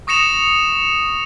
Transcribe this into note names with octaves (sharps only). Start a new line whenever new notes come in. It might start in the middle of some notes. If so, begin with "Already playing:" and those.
C#6 D#6 A#6 C#7 E7 F7